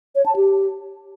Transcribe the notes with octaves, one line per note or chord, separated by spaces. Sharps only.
C#5
A5
G4